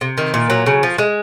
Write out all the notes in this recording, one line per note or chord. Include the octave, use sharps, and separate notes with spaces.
C3
D#3
A#2
F#3
C#3
F3
G#3